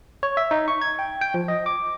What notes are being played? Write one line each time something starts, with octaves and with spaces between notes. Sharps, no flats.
C#5
E5
D#4
C#6
G#6
G5
G5
F3
D#5
D6